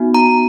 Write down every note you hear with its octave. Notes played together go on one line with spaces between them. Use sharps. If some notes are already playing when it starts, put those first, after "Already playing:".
Already playing: B3 D#4 F#4
A#5